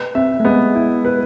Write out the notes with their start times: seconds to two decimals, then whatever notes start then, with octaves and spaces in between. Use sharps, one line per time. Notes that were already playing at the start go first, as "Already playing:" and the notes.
Already playing: B4
0.15 C4 E5
0.40 A3
0.45 G#3 B3
0.75 E4
1.05 B4